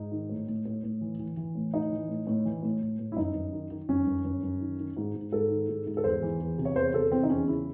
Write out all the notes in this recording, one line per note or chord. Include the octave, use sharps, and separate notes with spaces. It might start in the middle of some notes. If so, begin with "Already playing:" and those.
Already playing: G#2 D#4
D#3
A2
A2
A2
A2
E3
E3
E3
A2
A2 D#4
E3
A2
A2
E3
A2
A2
A2
E4
F#2 D#4
F#2
D#3
D#3
F#2 C#4
F#2
F#2
F#2
D#3
D#3
G#2
G#2
G#2 A4
D#3
G#2
G#2
A4
E2 C5
E3
E2
C3
C#5
E2 C5
C3 A4
E3 C4
D#4
E2 C#4
C#3 E4